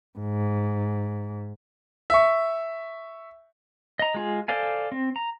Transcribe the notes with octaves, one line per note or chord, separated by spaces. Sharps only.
G#2
E5 C#6
D#5 A#5
G#3 F4 G#4
A4 C5 D5 F5 G#5
C4
A#5